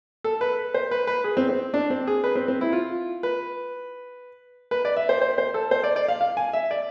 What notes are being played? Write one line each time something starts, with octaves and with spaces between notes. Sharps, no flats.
A4
B4
C5
B4
B4
G#4
C4
C4
D4
C4
G#4
B4
C4
C4
E4
F4
B4
B4
D5
E5
C5
C5
C5
A4
C5
D5
D5
F5
F5
G#5
E5
D5